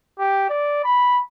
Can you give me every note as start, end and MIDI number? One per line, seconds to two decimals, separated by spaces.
0.19 0.47 67
0.49 0.82 74
0.84 1.19 83